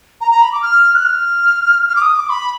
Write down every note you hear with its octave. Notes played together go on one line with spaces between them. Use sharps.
A#5
A#5
B5
D6
F6
F#6
F6
F6
D6
D#6
D6
B5